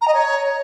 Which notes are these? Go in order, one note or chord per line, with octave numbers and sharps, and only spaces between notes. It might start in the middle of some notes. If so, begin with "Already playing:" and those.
A#5
D#5
C#5